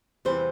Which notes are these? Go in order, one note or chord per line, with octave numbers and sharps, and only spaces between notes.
E2 C3 E3 G3 C5